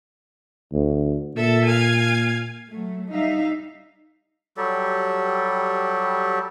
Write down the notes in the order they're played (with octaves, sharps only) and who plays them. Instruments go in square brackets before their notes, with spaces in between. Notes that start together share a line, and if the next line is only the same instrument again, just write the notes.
[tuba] D2
[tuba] A#2 [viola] A4 E5
[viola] F5 G#5
[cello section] F#3 A3
G3 D#4 E5 F5
[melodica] F#3 G3 G4 A4